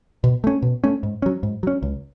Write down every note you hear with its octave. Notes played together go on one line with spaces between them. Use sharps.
B2
A3 C#4
B2
A3 C#4
G#2
F#3 C#4
G#2
F#3 C#4
C#2